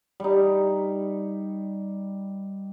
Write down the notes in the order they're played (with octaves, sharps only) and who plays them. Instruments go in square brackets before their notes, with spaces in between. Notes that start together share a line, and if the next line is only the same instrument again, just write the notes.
[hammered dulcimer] G3 D#4